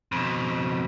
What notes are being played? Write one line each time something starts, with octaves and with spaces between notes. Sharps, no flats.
F2 B2